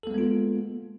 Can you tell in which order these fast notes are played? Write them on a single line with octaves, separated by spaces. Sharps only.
A4 A#3 G#3 B3 F4